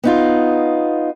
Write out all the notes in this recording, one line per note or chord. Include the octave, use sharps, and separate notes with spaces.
B3 D#4 F4